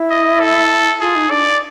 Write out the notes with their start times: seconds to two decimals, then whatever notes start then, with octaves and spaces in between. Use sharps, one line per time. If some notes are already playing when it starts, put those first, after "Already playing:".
Already playing: E4
0.10 D#5
0.40 A4
1.00 F4 G#4
1.15 D#4
1.30 D4 D5